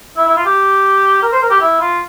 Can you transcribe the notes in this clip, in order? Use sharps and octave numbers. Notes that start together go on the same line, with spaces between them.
E4
E4
F4
G4
A#4
C5
A#4
G4
E4
F4